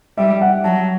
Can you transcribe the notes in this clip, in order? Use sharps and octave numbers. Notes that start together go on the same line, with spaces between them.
G3 E5
F#5
F#3 A5